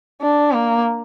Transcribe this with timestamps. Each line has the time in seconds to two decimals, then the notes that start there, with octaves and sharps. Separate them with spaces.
0.22 D4
0.53 A#3